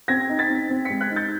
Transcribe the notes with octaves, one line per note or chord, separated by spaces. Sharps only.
C4 G#6 A#6
D#4
A6 B6
C4
C4
B6 C#7
G#3
F#6 G#6
D#4
G6 A6